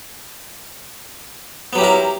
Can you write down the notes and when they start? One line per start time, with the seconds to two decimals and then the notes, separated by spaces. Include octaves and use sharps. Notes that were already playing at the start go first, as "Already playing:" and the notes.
1.73 B3
1.75 F#3
1.78 G4
1.81 E4
1.83 A#4